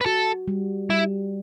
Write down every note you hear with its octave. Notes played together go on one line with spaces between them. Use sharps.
B4
F#4 A4
G3
G3 E4